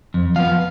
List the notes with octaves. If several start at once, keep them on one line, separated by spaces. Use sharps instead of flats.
F2
F3 B3 F5